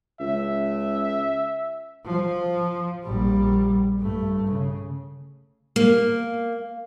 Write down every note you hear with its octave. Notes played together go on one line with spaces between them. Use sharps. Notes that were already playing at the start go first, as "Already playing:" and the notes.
C#2 E5
F3
A#1 G3
G2 A3
C#3
A#3